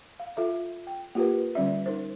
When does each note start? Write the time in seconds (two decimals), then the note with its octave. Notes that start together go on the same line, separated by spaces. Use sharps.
0.20 F5
0.37 F4 A4 E5
0.87 G5
1.15 A#3 F4 G4 A#4 B4
1.55 D3 G3 C#4 D5 E5
1.86 D#4 A#4 C5